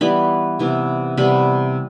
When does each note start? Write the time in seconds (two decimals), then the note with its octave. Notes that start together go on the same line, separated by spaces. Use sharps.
0.01 E3 G3 B3 B5
0.59 C3 E3 B3
1.17 C3 G3 B3 B5